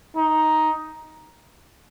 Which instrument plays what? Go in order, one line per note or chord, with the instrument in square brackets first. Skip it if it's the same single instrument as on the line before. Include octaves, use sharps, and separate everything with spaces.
[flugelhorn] D#4